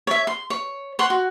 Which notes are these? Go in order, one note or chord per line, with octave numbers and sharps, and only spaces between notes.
C#5 E5
C6
C#5
C#5 F#5 C6
F#4